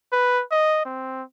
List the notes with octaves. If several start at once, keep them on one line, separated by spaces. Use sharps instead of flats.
B4
D#5
C4